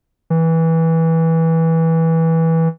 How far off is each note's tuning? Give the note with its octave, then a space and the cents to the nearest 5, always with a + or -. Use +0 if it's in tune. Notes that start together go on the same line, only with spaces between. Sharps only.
E3 -15